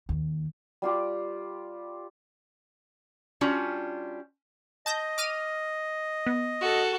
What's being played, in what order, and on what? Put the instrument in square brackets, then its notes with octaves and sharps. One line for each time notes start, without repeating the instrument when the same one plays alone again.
[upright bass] D#2
[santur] G3 F4 G4
[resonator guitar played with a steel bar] G3 C#4 D4 F4 F#4
[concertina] D#5 [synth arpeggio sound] A5 G6 A#6
[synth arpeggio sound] D6 F6 D#7
B3
[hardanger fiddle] F#4 A4